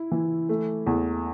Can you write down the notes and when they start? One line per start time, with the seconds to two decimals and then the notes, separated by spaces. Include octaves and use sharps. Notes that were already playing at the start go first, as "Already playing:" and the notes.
Already playing: E4
0.12 E3
0.49 A3
0.87 E2